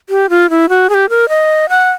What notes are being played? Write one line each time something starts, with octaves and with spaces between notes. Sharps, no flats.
G4
F4
E4
F#4
G#4
G4
A#4
D#5
F#5